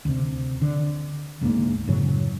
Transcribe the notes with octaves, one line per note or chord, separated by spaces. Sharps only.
D2 C3
D3
G#1 D2 G#2 A#3
F#2 A2 C#3 F#3